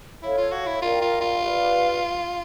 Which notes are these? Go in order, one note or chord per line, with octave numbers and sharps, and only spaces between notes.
E4 A4 C#5 F5
F4
F#4
E4
F4 A#4 D5 G5
F4
F4
G4 B4 D5 F5